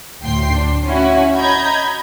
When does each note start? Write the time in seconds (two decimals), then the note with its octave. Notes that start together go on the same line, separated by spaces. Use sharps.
0.22 D2 A2 G5 C6 C7
0.52 D4
0.85 C#4 E4 F#4
1.37 D#5 A#5 B5 G6 G#6